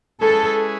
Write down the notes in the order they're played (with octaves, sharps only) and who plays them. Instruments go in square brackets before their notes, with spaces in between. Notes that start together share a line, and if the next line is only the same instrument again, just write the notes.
[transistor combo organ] G#3 C#4 E4 G#4 B4 [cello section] A4